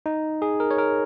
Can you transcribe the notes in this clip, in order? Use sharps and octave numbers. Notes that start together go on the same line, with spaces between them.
D#4
G#4
A#4
C#5
A#4